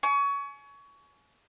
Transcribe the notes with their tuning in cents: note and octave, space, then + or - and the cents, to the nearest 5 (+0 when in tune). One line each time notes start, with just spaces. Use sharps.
G#5 +30 C#6 +25